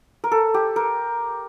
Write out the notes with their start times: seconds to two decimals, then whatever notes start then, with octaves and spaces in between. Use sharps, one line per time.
0.24 A#4
0.32 A4
0.54 G4
0.76 A#4